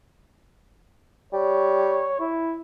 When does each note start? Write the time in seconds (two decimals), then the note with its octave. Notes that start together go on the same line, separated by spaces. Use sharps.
1.33 G3 C#5
2.19 E4